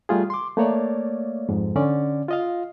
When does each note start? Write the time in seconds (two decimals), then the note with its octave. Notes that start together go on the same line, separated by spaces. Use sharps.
0.09 G3 A3 F4 G#4
0.30 C6 D6
0.57 A3 A#3 C#5 D5
1.49 F2 G#2
1.76 D3 C#4 D5
2.28 F4 D#5 F5